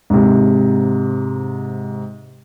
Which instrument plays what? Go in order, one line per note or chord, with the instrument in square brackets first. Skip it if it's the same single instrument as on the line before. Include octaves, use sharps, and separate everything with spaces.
[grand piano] G#2 C3